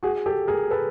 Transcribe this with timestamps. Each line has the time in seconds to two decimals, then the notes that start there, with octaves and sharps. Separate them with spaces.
0.03 F#4 G#4
0.26 G4 A4
0.48 G#4 A#4
0.71 A4 B4